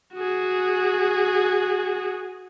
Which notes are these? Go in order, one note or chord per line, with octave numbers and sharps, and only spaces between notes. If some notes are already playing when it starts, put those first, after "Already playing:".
F#4 G#4